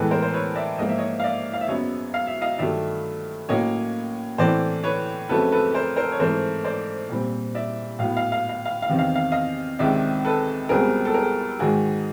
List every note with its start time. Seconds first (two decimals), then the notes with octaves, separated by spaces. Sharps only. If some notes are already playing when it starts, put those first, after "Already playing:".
Already playing: A2 E3 G#3 B3 A4 B4
0.11 A#4 C5
0.22 C5
0.34 B4 C#5
0.55 D5 E5
0.78 G#2 F3 A#3 D#5
0.89 E5
0.98 C#5 D#5
1.20 F5
1.24 D5 E5
1.53 F5
1.61 E5
1.68 F#2 C#3 F#3 B3 C#5 D#5
2.14 F5
2.27 E5
2.41 D#5 F5
2.58 G2 D#3 F#3 A3 D5 E5
3.49 A2 F#3 A#3 C#4 C#5 D#5
4.38 A2 E3 A3 C4 C5 D5
4.84 B4 C#5
5.29 F2 C#3 F#3 A3 C4 A4 B4
5.52 A4 B4
5.74 A#4 C5
5.96 A#4 C5
6.12 C#5
6.20 G#2 E3 A3 C4 A#4 C5
6.64 C5 D5
7.09 A#2 G3 C4
7.55 D5 E5
7.99 A2 F#3 B3 F5
8.17 F5
8.32 F5
8.49 F5
8.65 F5
8.82 F5
8.89 E2 C3 D#3
8.99 F5
9.15 F5
9.32 D#5 F5
9.79 C#2 C3 D#3 G#3 D5 E5
10.25 A4 B4
10.69 C#2 B2 G3 C4 G#4 A#4
11.05 A4
11.14 G#4 A#4
11.59 G#2 D#3 G#3 F#4 G#4